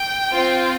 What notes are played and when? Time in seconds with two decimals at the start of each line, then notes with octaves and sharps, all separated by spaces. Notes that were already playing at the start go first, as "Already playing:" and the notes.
Already playing: G5
0.32 C4 F4